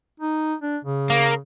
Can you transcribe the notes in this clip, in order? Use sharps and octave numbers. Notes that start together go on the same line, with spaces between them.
D#4
D4
C#3
A#3